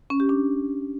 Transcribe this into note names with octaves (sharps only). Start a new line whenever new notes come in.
C#4
G4
D4